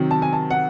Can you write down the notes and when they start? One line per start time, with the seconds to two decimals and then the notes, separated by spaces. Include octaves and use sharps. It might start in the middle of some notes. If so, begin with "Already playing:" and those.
Already playing: C3 D#3 F#3
0.11 A5
0.22 G#5
0.33 A5
0.51 F#5